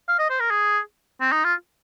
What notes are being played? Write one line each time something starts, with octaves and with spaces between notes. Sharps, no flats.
F5
D#5
C5
A#4
G#4
C4
D#4
F4